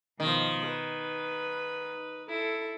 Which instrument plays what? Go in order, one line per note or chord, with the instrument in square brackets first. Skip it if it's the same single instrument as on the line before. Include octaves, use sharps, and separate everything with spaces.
[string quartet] B2 F3 [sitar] D#3
[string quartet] B4
E4 A4